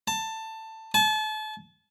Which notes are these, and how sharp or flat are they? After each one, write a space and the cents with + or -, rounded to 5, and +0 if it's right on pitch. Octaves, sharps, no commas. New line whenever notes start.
A5 +15
A5 -35